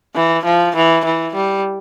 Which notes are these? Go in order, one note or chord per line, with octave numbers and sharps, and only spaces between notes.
E3
F3
E3
E3
G3